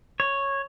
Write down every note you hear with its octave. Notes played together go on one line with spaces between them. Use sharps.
C#5